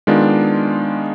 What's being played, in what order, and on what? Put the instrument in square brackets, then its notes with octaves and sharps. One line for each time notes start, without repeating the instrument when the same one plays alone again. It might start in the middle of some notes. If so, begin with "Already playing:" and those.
[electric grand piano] D#3 G#3 B3 D4 F4